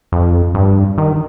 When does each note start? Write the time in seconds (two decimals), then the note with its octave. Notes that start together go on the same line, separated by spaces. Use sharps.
0.12 F2
0.55 G2
0.98 D#3